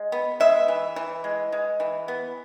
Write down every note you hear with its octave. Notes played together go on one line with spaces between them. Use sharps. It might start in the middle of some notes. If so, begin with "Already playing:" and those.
Already playing: G#3
B3
G#3 E5
E3
E3
G#3
G#3
E3
B3